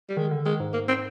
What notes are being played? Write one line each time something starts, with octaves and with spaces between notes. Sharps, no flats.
G3
D#3 G#3
D3
D#3 G#3
G#2
A#3
C4